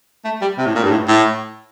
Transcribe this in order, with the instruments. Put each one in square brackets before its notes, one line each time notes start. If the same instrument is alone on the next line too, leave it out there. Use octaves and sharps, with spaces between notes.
[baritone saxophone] A3
G3
C3
A2
A#2
G2
A2
A2